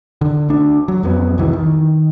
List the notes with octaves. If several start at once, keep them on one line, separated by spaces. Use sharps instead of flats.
D3
D2 D4
F#3
F2 F#3 B3
C2 F2 D#3 E3
D#3